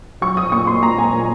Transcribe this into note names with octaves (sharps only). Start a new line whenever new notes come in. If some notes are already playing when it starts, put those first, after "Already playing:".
F#3 C#6
D#6
A#2 C#6
C6
A#2 A#5
G#5
A#2